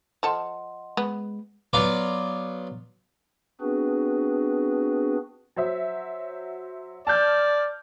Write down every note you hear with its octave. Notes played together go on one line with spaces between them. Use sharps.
F3 A4 D#5 F#5 C6
G#3 B3
F#3 B3 F4 D5
B3 C4 D4 F#4 G#4 B4
F#3 C5 E5
D5 A5 F6 G6